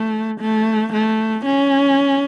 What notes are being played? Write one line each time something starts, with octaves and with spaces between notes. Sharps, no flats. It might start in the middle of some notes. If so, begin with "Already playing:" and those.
Already playing: A3
A3
A3
C#4